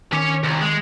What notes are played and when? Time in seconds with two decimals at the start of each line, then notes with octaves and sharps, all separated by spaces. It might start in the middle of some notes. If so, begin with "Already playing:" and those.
0.13 D#3 C#4 C#5 D6
0.43 C2
0.61 G#3